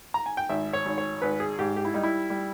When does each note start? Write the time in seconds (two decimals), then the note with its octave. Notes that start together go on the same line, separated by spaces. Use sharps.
0.14 A#5
0.26 G#5
0.37 G5
0.49 G#1 E5
0.73 C#5
0.86 G#1
0.98 C#5
1.22 G#1 B4
1.40 G#4
1.59 G#2 G4
1.77 G4
1.85 E4
1.94 G3 D#4
2.03 E4
2.30 G3